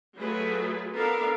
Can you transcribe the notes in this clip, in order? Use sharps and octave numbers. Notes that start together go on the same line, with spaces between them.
F#3 A3 F4 G#4 B4
B3 D4 A4 A#4 F5